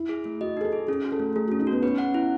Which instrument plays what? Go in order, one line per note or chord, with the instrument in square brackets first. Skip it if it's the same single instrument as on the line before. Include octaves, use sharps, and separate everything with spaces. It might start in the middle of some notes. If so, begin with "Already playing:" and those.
Already playing: [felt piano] E4
[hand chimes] G#4
A3
[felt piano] F#4 [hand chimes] D#5
[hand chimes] D#4 [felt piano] G#4
[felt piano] A4
[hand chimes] G#4
[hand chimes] C#4 [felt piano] G#4
[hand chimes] F#4
[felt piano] A4
[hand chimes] A3
[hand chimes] A3 [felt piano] G#4
[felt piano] F#4
[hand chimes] C#4
[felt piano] D#4
[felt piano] B3 [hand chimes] F#4
[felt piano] C#4 [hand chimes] B4
[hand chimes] F#5
E4